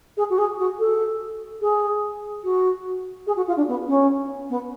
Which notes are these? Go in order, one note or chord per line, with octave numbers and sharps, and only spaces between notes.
G#4
F#4
G#4
F#4
A4
G#4
F#4
G#4
F#4
F4
D4
B3
C#4
B3